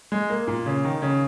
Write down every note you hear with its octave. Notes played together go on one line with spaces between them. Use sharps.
G#3
A#3
A#2
C#3
D#3
C#3